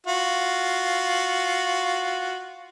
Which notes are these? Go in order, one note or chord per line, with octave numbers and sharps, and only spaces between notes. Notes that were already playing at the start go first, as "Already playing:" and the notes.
F4 F#4